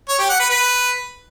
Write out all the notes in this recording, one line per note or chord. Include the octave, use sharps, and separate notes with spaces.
C#5
G4
F#5
B4
B4